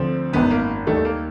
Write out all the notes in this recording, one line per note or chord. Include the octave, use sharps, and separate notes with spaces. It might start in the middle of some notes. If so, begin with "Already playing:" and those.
Already playing: D2 D3 F3 C4
G#1 F#2 D#3 B3
A#3
D#2 D#3 G3 A3
A#3